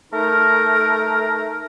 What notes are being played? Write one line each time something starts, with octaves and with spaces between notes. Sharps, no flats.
A3 D#4 A#4